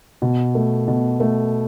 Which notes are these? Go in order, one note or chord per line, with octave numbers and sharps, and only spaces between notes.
B2
A3
B2
A3